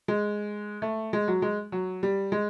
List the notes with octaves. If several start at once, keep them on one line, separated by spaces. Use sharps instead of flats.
G#3
A3
G#3
F#3
G#3
F#3
G3
G#3